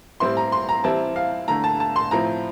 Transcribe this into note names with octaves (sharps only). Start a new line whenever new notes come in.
A2 G3 C4 E4 C6
A#5
C6
A#5
E3 G3 C4 E4 A5
F5
D3 A3 E4 A#5
A5
A5
C6
A2 F3 C4 E4 A#5